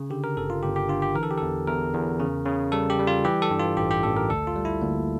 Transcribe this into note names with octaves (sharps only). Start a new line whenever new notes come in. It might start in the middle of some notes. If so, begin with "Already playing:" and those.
Already playing: C#3
D3 G4
A#4
G1 A4
F4
G1 G4
G4
D3 F4
G4
E3 A#4
A4
G4
E2 A4
E2 A#4
E2
C#3
C#3
G3 A4
G4
G3
F4
E3 G4
A4
G2
F4
A1 G4
G4
A1 A4
A#4
D2 A4
F4
G3
E4
D2 A#3